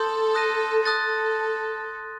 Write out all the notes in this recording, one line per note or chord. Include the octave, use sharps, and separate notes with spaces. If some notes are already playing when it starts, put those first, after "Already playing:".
Already playing: A4 C6 D#6 G6
D#6 F#6 A#6 D#7
A4 D#6 F#6 A6